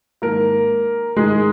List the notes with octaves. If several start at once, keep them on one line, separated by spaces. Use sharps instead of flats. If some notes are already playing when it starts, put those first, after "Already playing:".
G#2 D#3 A#3 A#4
G#2 D#3 G#3 G#4